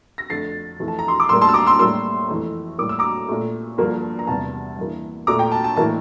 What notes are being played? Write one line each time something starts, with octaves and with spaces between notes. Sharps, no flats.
A#6
F2 D3 A3 A6 C7
F2 E3 A3
A5
A#5
C6
D6
A2 G3 A#3 C6 E6
A5 C6
E6
A#5 D6
C6 E6
A2 G3 A#3 C6 E6
F2 E3 A3
A2 G3 A#3 D6
E6
A#5 D6
A#2 A3
G2 D3 F3 A#3
A#5
E2 C3 G3 A5
G2 E3 A#3
A#2 A3 A#5 D6
G5 A#5
A5
A5
A2 E3 A#3 A5